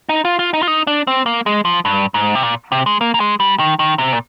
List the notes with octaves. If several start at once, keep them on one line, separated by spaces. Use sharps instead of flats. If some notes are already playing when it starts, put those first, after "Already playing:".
D#4
F4
F4
D#4
F4
D#4
D4
C4
A#3
G#3
F3
G2
G#2
C3
A#2
C3
G#3
A#3
A#3
G#3
G3
D#3
D#3
C3
A#2